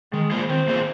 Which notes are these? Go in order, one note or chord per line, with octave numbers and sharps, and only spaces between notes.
D#3 G#3
A#3 F4 G#4 C5
D#3 C4
A#3 F4 G#4 C5